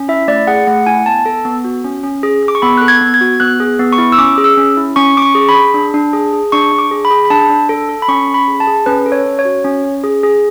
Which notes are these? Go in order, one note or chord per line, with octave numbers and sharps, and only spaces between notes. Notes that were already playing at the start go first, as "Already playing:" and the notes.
Already playing: C#4
E4 E5
A3 D5
G#4 F#5
A3 F#5
E4 G#5
B3 A5
A4
B3
F#4
C#4
C#4
G#4
G#4
D6
C#6
B3 B5
A4 F#6
G#6
B3
G#6
F#4
B3 F#6
G#4
B3
C#6
E4
E6
C#4 D6
G#4
E6
C#4
E4
C#4 C#6
C#4 D6
C#6
G#4
B5
G#4
D4
D4
G#4
G#4
D4 C#6
D4
D6
G#4
B5
G#4
B5
D4 A5
D4
A4
A4
B5
C#4 C#6
C#4
B5
G#4
A5
G#4
C#4 B4
A4
C#5
C#4
C#5
F#4
C#4
C#4
G#4
G#4